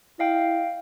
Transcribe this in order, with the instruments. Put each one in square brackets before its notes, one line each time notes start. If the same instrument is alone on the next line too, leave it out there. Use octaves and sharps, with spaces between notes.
[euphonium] E4 [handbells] D#5 F5 G5